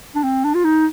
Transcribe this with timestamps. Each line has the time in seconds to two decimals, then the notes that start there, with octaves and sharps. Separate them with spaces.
0.16 D4
0.24 C4
0.44 D4
0.55 F4
0.65 D#4